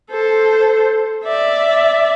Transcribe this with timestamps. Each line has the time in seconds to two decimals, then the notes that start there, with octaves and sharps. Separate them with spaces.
0.10 A4 C5
1.24 D5 E5